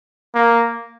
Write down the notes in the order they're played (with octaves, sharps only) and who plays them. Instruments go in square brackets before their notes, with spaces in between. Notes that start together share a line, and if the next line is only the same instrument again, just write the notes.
[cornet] A#3